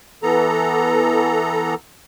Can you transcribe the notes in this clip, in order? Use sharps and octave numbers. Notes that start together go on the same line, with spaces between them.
E3 B3 A4 A#5